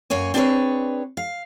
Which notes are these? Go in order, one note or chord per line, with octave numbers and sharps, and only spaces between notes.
F#2 A#3 C#5 G#5
C4 D4 G#4 A4 B4 C#5
F5